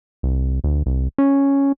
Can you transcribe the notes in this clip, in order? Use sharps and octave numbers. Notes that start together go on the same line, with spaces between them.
C2
D2
C2
C#4